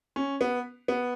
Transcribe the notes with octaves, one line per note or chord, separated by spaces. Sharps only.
C#4
B3
B3